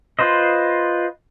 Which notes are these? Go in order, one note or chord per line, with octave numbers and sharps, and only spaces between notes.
F4 B4 C5 D#5